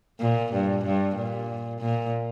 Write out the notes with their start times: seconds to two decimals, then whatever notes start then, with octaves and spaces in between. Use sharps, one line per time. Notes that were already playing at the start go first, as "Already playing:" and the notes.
0.20 A#2
0.53 G2
0.85 G2
1.16 A#2
1.80 A#2